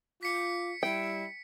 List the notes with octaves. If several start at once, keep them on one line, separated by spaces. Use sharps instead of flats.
F4 D6 B6 C#7
G3 E4 G5